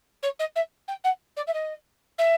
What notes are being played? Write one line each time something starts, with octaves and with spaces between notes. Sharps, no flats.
C#5
D#5
E5
G5
F#5
D5
E5
D#5
E5